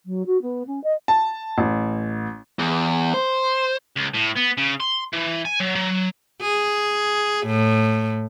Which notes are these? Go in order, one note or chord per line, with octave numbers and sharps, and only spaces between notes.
F#3
F#4
B3
C#4
D#5
A5
A1
E2
C5
C#2
A2
B3
C#3
C6
E3
G#5
F#3
F#3
G#4
A2